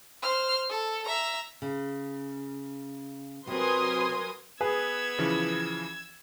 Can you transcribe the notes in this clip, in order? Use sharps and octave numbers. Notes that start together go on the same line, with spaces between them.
C5 F6
A4
E5 A#5
C#3
C3 F#3 C4 A#4 B4 G#5 C6 D#6
B3 G#4 B4 E6 G#6
C#3 E3 F3